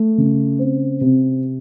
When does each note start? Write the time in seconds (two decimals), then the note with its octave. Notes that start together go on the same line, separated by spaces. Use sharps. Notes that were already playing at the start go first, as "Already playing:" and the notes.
Already playing: A3
0.18 C#3
0.59 C4
1.01 C3